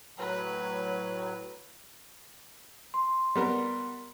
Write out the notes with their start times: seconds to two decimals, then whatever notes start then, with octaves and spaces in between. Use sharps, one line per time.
0.19 A2 F#3 B4
2.94 C6
3.36 G3 B3 A#4